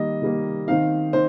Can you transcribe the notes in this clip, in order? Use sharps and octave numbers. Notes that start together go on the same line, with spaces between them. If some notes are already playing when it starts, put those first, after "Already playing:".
Already playing: D#3 G3 A#3 D#5
D#3 G3 A#3
D#3 C4 D#4 F5
D#3 C5